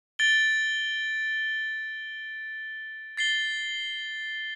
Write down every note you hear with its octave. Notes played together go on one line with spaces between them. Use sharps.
A6 D7 G7
A6 C7 G7